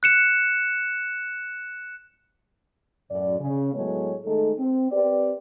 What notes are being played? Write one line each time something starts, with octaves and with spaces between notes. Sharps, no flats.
F#6 C#7 E7
F#2 A2 D5
C#3
A2 F#3 G#3 A3 B3 C#5
D#3 G#3 A3 D#4 A4
C4
C4 G4 B4 D5